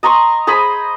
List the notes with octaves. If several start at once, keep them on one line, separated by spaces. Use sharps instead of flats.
D#5 A#5 C6 C#6
G#4 C5 D#5 B5